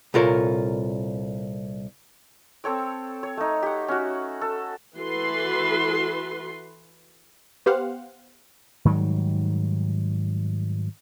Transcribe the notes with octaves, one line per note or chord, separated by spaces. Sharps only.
C2 A#2 F4 A4 A#4 C#5
C4 A4 C#5 G5
C#5
A3 D#4
G4 F#5
C#4 F#4
A4
E3 F#4 A4 B4 C6
B3 G4 C5 F5 F#5
G#2 D#3 F#3 G3